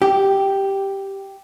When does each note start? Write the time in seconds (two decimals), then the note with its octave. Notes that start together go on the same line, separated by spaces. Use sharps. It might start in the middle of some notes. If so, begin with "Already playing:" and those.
0.02 G4